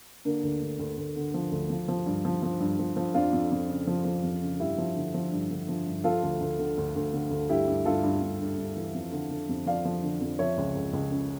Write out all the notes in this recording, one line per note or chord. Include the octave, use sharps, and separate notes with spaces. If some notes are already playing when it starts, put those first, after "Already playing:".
D3 A#3 D4
D2
D2
D2
D2
D3
F3
D2
F3
F3
G2
F3
F3
G2
F3
F3
F2 D4 F4
F2
F2
C#3
F3
F3
F2
C#3
G2 E4 G4
F3
D3
F3
G2
D3
F3
G2
F3 F4 A4
D2
D2
D3
D2
D2
D3
D2
G2 E4 G4
G2
G2 F4 A4
G2
G2
G2
G2
E3
F2
D3
D3
F2
F3 D5 F5
F3
D3
F2
F3 C#5 E5
C#2
C#2
C#2
C#3